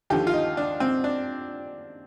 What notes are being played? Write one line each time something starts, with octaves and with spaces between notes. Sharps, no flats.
D#2 D3 F3 G4
F4
D#4
D4
C4
D4